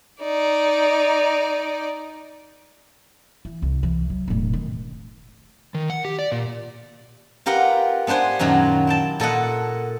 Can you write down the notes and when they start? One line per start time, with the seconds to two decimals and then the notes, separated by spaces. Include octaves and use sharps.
0.21 D#4 D5
3.45 E3
3.62 C2
3.83 E3
4.10 F#3
4.28 E1 A2
4.53 D#3 C4
5.75 D#3
5.90 F#5
6.05 G4
6.19 D5
6.32 A#2
7.46 F4 G4 A#4 B4 F#5
8.07 B3 D4 B4 C5 G#5
8.39 F#2 A#2 D#3 F#3
8.87 E4 G5 A5
9.20 A#2 A4 D#5 F#5